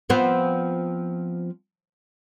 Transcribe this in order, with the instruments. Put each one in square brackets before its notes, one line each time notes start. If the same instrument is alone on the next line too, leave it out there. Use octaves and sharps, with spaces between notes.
[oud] F3 B3 C4